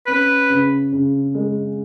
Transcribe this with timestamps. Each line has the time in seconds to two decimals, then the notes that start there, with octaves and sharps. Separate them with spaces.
0.07 C#4 B4
0.50 C#3
0.92 C#3
1.35 G#3